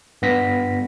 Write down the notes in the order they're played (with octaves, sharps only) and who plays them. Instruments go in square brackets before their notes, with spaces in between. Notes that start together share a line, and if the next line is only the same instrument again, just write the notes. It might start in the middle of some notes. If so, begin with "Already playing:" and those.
[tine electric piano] G2 B3 A#6 B6